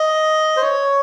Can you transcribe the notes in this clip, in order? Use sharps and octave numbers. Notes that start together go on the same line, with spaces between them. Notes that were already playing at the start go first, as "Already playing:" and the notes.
Already playing: D#5
C5
C#5